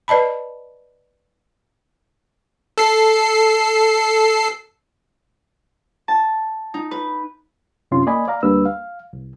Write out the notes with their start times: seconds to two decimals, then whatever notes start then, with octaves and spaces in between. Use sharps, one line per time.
0.08 B4 D5 D#5 A5 B5
2.78 A4 C7
6.08 A5
6.74 D#4
6.91 B4
7.91 F#2 C3 C#4 F4 C6
8.07 A#3 D5 D#5 G#5 B5
8.28 D5 F5 A#5
8.43 D2 G3 A#3 D4 B4 E6
8.66 F5
9.13 C2